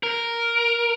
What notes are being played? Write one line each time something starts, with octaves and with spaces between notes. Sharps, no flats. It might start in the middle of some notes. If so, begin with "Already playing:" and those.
A#4